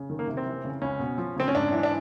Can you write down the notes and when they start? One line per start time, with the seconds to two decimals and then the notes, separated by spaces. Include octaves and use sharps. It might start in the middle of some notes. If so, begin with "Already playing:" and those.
Already playing: C#3
0.10 D#3
0.19 A#3
0.27 C3
0.37 C4
0.45 E3
0.65 C#3
0.81 C#2 C#4
1.00 B2
1.18 F3
1.36 C#3 C4
1.48 C#4
1.55 G#2 D4
1.72 E3
1.83 D4